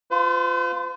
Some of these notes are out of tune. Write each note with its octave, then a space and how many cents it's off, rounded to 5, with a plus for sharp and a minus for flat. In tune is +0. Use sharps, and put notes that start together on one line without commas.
F4 +0 C5 -45